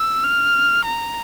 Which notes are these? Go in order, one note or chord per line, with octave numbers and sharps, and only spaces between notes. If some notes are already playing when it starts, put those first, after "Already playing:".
Already playing: E6
F6
A#5